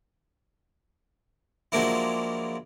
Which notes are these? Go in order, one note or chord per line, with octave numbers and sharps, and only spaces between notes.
F3 F#3 G#3 A#3 D4 E4